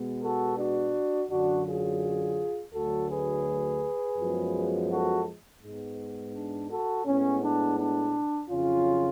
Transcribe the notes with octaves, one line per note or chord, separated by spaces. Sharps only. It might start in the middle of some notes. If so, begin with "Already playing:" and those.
Already playing: B2 G#3 B3
F#4 A4
D4 F#4
F#2 D3 F#3 D4 F#4
F4 G#4
D2 D3 F#3 A3 F#4 A4
G#4 B4
F#2 F3 G#3 B3
F#4 A4
G#2 G#3 B3
D4
F#4 A4
A2 G#3 B3 C#4
D4
D4
F2 C#3 F#3 C#4 F4